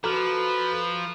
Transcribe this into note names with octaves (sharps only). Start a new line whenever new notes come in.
F3 F#4 A4 B4 A#5 D6 F6